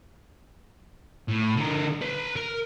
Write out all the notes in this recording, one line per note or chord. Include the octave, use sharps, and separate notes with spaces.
A2
D3 A#4
B4 C6
A#4